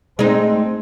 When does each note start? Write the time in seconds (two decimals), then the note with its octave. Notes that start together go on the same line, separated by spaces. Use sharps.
0.19 G#3 A3 C4 D#4